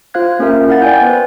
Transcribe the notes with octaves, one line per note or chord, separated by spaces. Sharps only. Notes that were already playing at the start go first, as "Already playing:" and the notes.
F4 C5 F5 F#6 G#6
A#3 C#4 G4 A#4 E5
E4 F5 F#5 A6
D5 G5 G#5 G6
B3 B4 C5